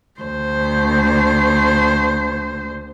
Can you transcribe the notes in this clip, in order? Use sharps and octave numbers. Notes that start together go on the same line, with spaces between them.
D2 C5